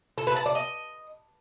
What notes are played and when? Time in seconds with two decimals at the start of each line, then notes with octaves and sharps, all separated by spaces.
0.18 A4
0.27 B4
0.36 A5
0.46 D5
0.55 D#5